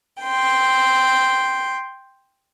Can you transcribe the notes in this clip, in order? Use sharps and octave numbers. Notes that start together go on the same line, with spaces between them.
G5 C6